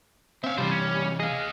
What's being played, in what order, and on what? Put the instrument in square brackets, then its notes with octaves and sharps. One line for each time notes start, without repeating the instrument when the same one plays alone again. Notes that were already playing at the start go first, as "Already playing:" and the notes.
[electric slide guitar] C4 C#4 [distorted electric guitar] E5 F5
[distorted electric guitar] C3 E3 [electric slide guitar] G3 [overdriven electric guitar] F4 C5
[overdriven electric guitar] C#4
[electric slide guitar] G#4 [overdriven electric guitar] D#5 F5